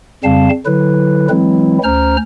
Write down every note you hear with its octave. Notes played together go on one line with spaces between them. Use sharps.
F2 C#3 G3 C4 F5 A5
D3 F#3 E4 B4
E3 F#3 G#3 C4 E4
D2 C#4 C5 A#5 F6